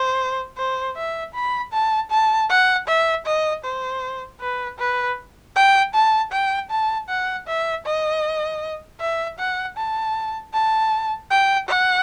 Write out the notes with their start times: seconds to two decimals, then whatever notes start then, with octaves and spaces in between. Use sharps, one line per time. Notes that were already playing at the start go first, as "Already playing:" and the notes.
Already playing: C5
0.57 C5
0.96 E5
1.34 B5
1.73 A5
2.11 A5
2.49 F#5
2.87 E5
3.26 D#5
3.64 C5
4.41 B4
4.79 B4
5.56 G5
5.94 A5
6.32 G5
6.70 A5
7.09 F#5
7.47 E5
7.86 D#5
9.00 E5
9.39 F#5
9.77 A5
10.53 A5
11.30 G5
11.69 F#5